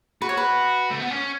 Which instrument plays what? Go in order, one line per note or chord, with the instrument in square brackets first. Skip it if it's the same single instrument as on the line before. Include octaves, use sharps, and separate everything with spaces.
[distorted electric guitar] F#4 [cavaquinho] B4
[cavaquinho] C#5
B4
[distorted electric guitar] A3
B3
C#4